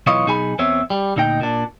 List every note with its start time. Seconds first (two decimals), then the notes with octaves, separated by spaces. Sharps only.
0.07 B1 E3 F4 B4 C#5 D#5
0.26 B1 D#4 G#4 G#5 B5
0.59 E2 B3 C4 C#5 E5
0.90 G3
1.16 D2 A#2 D#4 D#5 G5
1.41 A#2 D4